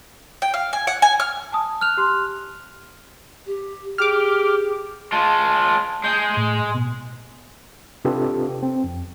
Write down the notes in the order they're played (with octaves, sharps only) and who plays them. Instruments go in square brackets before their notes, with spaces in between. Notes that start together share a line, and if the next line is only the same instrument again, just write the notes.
[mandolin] G5
F5
G#5
F#5
G#5
F6
[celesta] G#5 A5 D#6
[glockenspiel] F6 F#6 F7
[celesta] G4 C6
[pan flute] G4
[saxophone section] G4 [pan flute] G#4 [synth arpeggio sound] D6 F6
[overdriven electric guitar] G#3 F4 [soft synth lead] A5
[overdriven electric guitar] G#3 G#4 [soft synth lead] G6
[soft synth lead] A2
B2
[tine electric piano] C3 D4 F4 G4 A4 B4
C4
F2